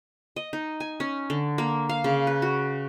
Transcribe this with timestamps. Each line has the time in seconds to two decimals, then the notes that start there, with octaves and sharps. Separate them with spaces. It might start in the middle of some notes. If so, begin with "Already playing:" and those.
0.36 D#5
0.53 D#4
0.80 G#5
1.00 C#4
1.30 D3
1.58 A#3
1.89 F5
2.04 C#3
2.27 B4
2.42 F#4